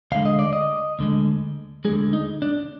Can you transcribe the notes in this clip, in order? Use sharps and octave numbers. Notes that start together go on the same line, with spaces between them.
D2 D3 G#3 F5
D#5
D5
D#5
D2 D3 G#3
D2 D3 G#3 G#4
D#4
D4